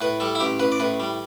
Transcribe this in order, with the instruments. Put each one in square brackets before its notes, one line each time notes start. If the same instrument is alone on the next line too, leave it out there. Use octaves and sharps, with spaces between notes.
[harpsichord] A2 B4
G3 A4
E4
A1 G4
A1 B4
D5
A2 B4
G3